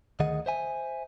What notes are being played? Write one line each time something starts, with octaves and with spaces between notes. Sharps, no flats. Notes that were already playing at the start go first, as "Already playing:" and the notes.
D2 D#3 G#4 D#5 F#5
C5 E5 G#5